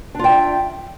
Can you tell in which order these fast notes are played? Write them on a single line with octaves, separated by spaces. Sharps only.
D4 F4 G5 E5